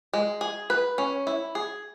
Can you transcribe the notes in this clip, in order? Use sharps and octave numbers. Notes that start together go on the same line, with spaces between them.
G#3
G#4
B4
C#4
E4
G#4